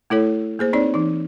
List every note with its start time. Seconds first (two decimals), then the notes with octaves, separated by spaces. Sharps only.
0.10 A3 E4 A4 C#5
0.59 A#3 G#4 C5
0.73 C4 D#4 C#5 D5
0.94 E3 D#4